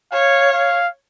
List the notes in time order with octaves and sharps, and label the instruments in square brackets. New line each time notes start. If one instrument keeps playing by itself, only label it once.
[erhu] C#5 [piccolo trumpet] F5
[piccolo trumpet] F5